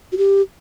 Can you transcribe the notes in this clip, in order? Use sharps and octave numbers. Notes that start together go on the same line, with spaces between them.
F#4
G4